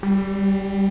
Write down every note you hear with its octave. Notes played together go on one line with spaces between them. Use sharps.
G3